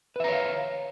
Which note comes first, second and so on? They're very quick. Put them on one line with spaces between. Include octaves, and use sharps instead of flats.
B4 E5 A#5 C#5 F5